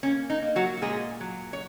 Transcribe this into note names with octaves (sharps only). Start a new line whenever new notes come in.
A#3 C#4
D#4
A#3
F#3 F#4
F#4
A#2 G#3 G#4
F#3
C#5